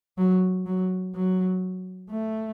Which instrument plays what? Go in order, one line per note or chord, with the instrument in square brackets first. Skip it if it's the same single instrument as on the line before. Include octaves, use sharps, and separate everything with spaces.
[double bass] F#3
F#3
F#3
A3